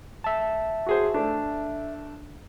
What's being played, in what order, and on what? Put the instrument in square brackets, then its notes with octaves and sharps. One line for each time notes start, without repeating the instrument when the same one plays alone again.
[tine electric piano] E5 A5
[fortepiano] F#4 G#4 C5
A3 D4